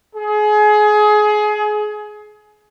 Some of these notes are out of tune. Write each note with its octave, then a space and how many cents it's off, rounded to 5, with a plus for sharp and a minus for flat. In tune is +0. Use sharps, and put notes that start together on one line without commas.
G#4 +25